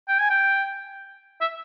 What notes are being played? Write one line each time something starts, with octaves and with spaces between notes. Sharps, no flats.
G5
G#5
G5
E5